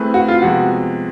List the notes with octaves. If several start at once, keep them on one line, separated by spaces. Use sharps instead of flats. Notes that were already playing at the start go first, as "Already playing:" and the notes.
Already playing: A3 C4 E4 G#4 B4
F#4
F4
C3 F3 G#3 B3 F#4